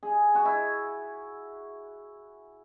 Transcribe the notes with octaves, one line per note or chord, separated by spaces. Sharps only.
G#4
F#4
E4